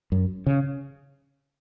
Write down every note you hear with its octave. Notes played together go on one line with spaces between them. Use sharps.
F#2
C#3